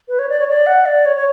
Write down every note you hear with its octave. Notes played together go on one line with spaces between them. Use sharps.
B4
C#5
D5
C#5
D5
F#5
D5
C#5
C#5